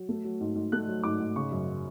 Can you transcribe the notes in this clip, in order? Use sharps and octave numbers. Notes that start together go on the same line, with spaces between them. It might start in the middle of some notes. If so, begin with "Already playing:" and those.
Already playing: F#3
A3
F#3
G#2
G#2
A3 F#6
F#3
G#2 D6
G#2
C#3 C#6
F#2